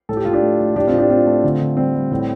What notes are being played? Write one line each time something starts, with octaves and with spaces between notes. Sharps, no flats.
A2 A4
G4
A2 F4
D4 G4
A3
A3
A2 D4 G4
C4 F4
A2
D4 G4
A3 C4 F4
A3
D3
D3
G3 C4
G3
A2